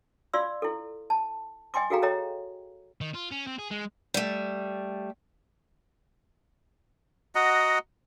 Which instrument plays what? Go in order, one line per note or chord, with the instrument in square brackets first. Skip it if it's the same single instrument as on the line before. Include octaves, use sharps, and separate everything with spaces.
[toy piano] F4 D5 F5 C6 E6
E4 A4
A5
D#5 G5 G#5 C6 D6
F#4 G#4 A4 F5 G5 A#5
A4 C#5 D#5 G5 A#5
[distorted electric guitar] D#3
F4
C#4
C4
G#4
G#3
[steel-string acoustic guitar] G3 A3
[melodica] F#4 D#5 F#5 A#5